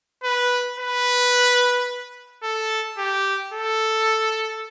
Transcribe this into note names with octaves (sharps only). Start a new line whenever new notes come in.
B4
B4
A4
G4
A4